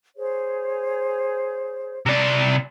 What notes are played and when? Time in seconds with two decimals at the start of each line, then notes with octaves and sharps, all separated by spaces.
0.16 G#4 C5 C#5
2.06 C3 D5